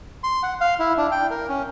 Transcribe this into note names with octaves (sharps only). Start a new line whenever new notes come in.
C6
F#5
F5
E4
D4
G5
A#4
C#4